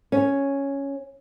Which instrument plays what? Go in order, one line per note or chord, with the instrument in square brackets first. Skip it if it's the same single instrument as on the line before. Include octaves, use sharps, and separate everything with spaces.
[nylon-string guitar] C#4